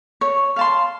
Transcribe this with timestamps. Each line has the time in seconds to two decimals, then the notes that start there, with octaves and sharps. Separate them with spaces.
0.21 C#5
0.56 F5 A5 C6